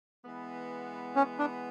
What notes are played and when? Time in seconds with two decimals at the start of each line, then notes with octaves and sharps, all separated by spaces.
0.24 E3 G#3 B3
1.16 C#4
1.39 D4